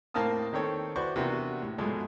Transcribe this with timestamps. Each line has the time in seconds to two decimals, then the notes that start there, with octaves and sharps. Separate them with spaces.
0.14 A2 A#3 C4 F5 A5 D#6
0.53 D#3 C4 A4 C#5
0.96 E4 F#4 B4 C5 D5 C#6
1.16 C3 E3 A#3 B3 D4 F#4
1.62 A2
1.78 G#2 B2 F3 F#3 G#3 A3